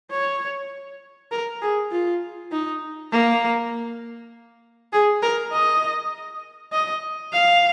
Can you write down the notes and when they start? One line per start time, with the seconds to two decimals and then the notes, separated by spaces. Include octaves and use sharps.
0.11 C#5
1.31 A#4
1.62 G#4
1.92 F4
2.52 D#4
3.12 A#3
4.93 G#4
5.23 A#4
5.53 D#5
6.73 D#5
7.33 F5